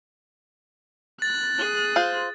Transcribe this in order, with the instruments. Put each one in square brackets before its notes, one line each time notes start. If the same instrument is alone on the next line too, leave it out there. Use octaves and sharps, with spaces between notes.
[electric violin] F#6 [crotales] A6
[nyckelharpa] G#4
[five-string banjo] F4 C5